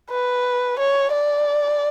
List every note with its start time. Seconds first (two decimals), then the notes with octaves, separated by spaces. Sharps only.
0.10 B4
0.79 C#5
1.12 D5